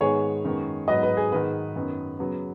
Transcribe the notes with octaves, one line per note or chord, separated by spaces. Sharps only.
G#2 D#3 G#3 B3 G#4 C#5
F#2 D#3 G#3 B3
G#2 F#3 B3 B4 D#5
B4
G#4
G#2 D#3 G#3 B3 B4
F#2 D#3 B3
C#3 F#3 B3